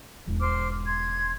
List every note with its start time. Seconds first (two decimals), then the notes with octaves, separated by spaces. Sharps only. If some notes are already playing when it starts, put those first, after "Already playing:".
0.26 E1 G#2
0.40 C5 D6 F6
0.85 C6 G#6